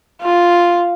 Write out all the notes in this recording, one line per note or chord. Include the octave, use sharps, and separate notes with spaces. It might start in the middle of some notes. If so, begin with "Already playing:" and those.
F4